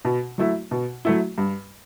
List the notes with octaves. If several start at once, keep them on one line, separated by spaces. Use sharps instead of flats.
B2
F#3 A3 E4
B2
F#3 A3 E4
G2